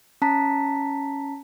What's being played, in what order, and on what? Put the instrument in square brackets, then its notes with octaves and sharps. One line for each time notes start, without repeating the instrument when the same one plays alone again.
[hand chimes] C#4 A5 A#5 B6